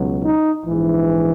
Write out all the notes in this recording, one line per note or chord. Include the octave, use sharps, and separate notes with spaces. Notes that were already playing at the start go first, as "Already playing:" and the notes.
Already playing: C#2 B2 F#3
D#4
A#1 G#2 E3